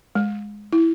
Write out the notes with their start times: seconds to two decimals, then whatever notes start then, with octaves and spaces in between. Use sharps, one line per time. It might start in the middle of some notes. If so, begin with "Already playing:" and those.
0.15 G#3
0.73 E4